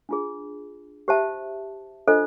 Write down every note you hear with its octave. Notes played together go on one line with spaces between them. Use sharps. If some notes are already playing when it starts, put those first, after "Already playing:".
D4 F4 G#4
G4 C5 E5 A5
D4 F4 A4 C5 D#5